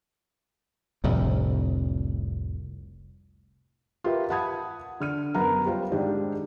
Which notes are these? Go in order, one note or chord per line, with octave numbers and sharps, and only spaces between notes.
F1 C2 A2 D3
F4 G4 A#4 B4 E5
F#5 A5 B5 D#6 G#6
D3 F6 D#7
F#2 B3 A#4 F#5 A#5
G3 F4 C5 F5
G#2 D#3 D4 G4